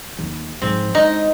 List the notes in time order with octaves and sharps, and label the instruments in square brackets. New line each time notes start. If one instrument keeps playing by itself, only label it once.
[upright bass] D#2
[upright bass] G#2 F3 [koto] C4
[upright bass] G#3 [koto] D#4